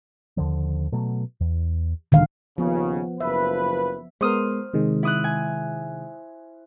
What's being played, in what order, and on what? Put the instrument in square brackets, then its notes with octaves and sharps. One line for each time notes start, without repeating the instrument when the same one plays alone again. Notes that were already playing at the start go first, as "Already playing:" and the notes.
[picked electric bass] D#2 D3 F3
B2 F#3 A3
E2
[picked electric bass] D1 A#2 G#3 [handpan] D3 D#3 F5
[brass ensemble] D#2 C#3 [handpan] F3 B3
[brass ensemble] F#1 F3 B4 [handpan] E5
[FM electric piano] G#3 B3 A#4 [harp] C5 D#6 F6
[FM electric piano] C3 D#3 G#3
[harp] E4 D#6 F#6
G#5